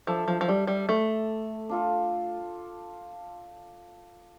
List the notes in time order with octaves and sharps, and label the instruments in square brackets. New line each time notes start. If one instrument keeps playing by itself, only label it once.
[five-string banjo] F3 [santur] D4 A4 E5
[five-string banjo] F3
F3
G3
G3
A3
[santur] D4 F4 A4